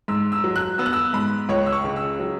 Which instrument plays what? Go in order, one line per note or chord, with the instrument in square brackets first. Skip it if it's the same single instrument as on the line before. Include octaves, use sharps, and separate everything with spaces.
[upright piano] G#2 E6
E6
F#3
F#6
B3 E6
F#6
E6
G#2 B5
C#2 C#5
E6
C#6
C#3
E6
F#3